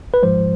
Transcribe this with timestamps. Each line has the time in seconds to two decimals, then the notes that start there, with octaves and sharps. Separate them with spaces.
0.14 B4
0.23 G#2 F3 G#3 C5